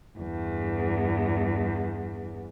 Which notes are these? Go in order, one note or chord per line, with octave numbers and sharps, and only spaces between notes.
E2 G2